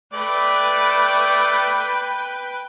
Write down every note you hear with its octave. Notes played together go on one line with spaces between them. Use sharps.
A3 B4 D5 G5